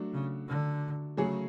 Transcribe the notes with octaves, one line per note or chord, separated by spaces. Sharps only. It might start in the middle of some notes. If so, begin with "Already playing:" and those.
Already playing: F#3 A3 D4
C#3
D3
C#3 F#3 A3 C#4 G#4